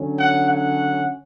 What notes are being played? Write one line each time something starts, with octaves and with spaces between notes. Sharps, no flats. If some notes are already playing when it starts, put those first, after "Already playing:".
Already playing: D3 F#3 C#4
F#5
F#5